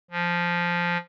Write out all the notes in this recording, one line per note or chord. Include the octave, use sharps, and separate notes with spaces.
F3